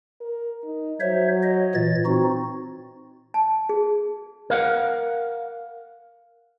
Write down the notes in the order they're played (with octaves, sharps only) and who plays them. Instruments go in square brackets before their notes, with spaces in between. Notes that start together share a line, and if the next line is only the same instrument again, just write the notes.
[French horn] A#4
D#4
[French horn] F#3 [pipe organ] C5 C#5 E5
[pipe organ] C#5 D#5
A#2 E3 A6
[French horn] C4 [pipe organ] D#4 F#4
[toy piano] A5
G#4
[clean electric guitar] A#4 F5 F#5